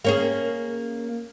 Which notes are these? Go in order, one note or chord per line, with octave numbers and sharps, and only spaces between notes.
A#3 C#4 G#4